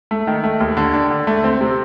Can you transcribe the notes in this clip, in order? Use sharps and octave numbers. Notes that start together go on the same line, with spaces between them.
A3
D#3
A3
D#2
D3
D4
D3
A3
C4
C3